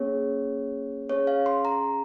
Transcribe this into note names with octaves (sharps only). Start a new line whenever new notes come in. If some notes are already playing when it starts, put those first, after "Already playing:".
Already playing: A#3 C#4 G#4 C#5
C#4 G#4 C#5
F5
C6
A#5